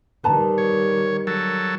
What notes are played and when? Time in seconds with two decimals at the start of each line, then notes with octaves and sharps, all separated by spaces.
0.24 D#3 G3 B4 A5 A#5
0.58 C#5
1.27 F#3 A4